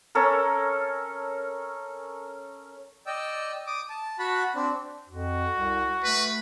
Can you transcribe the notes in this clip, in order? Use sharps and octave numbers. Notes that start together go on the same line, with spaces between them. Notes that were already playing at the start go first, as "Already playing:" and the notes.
C#4 A4 A#4
D5 D#5 G5 E6
D6 D#6
A5
F#4 F#5 A5 B5
C4 D4
F2 F#4
C2
A3 B4